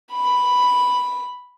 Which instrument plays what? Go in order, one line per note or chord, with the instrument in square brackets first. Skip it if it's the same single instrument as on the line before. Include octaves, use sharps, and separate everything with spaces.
[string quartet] B5